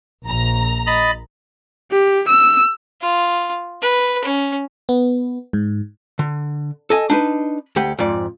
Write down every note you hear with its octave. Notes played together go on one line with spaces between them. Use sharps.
A#1 A#5
D#5 B5 A6
G4
E6
F4
B4
C#4
B3
G#2
D3
A4 D#5 G#5
D4 D#4 B4
D2 G4 F#5
F2 G#2 D5